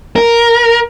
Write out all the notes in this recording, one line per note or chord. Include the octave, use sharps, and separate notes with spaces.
A#4